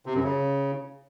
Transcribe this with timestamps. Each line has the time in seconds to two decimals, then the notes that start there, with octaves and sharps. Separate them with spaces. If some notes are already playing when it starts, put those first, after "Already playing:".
0.06 C3
0.15 F#2
0.23 C#3